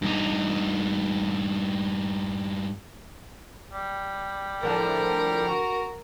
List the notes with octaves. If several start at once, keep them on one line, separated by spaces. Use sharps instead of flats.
G2 D#4
G3
A2 D3 F3 A#4
F#4